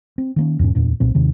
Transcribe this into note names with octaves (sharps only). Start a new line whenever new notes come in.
C4
D#3 A#3 C#4
E2 G#2 B2 C#4
D1 E2 A#2 D4
B1 A#2 C4
D#2 C3 D#3